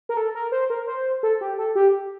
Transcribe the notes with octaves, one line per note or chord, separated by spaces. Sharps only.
A#4
A4
A#4
C5
A#4
C5
A4
G4
A4
G4